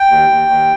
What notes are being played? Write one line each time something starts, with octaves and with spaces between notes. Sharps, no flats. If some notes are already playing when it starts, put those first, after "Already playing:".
Already playing: G5
D#2
D#2
D#2